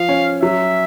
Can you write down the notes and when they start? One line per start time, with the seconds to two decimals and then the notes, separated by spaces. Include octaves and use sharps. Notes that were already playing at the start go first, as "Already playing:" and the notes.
Already playing: F3 F5
0.09 C#4
0.42 F#3 E5